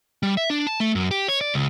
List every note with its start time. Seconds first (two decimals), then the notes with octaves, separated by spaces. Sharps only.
0.23 G3
0.37 E5
0.50 D4
0.67 A5
0.80 A3
0.95 F#2
1.11 G4
1.28 C#5
1.41 D5
1.54 C#2